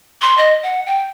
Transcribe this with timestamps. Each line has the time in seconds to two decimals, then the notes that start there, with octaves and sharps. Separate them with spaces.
0.22 C6
0.38 D#5
0.63 F#5
0.86 G5